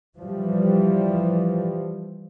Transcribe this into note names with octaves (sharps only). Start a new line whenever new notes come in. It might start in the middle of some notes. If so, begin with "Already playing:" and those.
E3 F3 G3